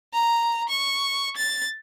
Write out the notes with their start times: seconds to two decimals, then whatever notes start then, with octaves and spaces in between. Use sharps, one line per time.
0.13 A#5
0.69 C#6
1.37 A6